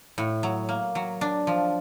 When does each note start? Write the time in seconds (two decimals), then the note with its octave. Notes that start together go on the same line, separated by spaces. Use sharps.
0.18 A2
0.43 F#3
0.69 A#3
0.95 F#3
1.21 D4
1.47 F3